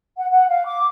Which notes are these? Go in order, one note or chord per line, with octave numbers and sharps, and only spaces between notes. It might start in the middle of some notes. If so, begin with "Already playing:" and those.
F#5
F#5
F5
D6